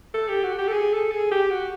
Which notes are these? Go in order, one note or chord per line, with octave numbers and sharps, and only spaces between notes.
A4
G4
F#4
G4
A4
G#4
A4
G#4
G4
F#4